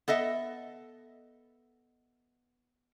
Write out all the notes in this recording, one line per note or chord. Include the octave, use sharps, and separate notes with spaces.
B3 A4 D#5 E5